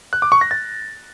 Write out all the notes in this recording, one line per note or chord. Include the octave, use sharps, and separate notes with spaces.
F#6
D6
C#6
A#6
A6